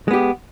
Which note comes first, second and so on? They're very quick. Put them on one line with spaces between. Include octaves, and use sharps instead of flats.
G#3 B3 G4